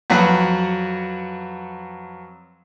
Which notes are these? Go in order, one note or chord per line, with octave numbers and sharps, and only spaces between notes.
F2 F#3 F#4 B4 F#5